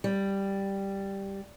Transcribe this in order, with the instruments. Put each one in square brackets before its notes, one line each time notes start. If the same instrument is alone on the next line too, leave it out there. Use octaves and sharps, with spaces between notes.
[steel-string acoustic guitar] G3